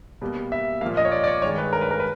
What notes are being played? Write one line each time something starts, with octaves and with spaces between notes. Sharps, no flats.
B2 G3 A#3
E5
A#2 F3 A#3 F5
D#5
C#5
D5
D5
C#5
G2 D#3 G#3 C#5
B4
A#4
B4
A#4
B4